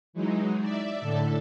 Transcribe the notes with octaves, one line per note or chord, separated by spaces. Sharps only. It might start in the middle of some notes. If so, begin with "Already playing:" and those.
E3 F#3 G#3 D#4
D5 E5
A2 D3 A4